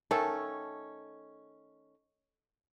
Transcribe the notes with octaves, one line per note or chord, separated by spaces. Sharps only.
D#3 A3 C#4 A4